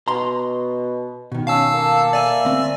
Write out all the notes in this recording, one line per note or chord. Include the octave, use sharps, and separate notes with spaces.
B2 A#5 C6
B2 D#3
C#4 F5 A5 E6
A#3 A4
D5 E5 G#5
D2 C4